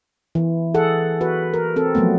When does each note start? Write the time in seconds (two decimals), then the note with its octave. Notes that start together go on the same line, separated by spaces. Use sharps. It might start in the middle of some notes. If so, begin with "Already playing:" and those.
0.35 E3
0.74 G#4 A4 F#5
1.21 F#4 B4
1.54 A#4
1.76 C4 A4
1.95 F3 F#3 A3 B3